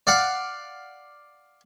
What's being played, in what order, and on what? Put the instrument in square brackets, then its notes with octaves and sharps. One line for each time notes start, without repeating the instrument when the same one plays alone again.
[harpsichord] D5 F5 F#5 D6